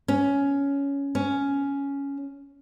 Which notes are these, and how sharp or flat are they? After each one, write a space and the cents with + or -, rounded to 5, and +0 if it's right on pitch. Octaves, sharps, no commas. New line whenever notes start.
C#4 +10
C#4 +10